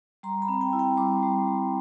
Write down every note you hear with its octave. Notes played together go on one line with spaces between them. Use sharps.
G3 A#5 C6
A5 B5
C4
G5 A5
E4
G5 A5
G3 C6 D6
G3
G3